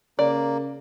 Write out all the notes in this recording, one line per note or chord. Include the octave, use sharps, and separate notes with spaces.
C#3 A#3 D5